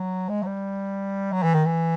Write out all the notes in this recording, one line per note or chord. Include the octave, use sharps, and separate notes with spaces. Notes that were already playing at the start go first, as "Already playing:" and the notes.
Already playing: F#3
G#3
F#3
G3
F#3
E3
D#3
E3